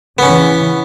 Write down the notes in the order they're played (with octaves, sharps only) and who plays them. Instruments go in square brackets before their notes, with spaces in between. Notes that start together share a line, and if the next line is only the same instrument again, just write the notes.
[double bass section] C#3 E3 [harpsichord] B3 C#4